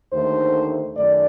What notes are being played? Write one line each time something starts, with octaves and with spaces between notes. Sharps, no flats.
D#2 D3 A3 D#4 C5
F#2 D#3 A3 D5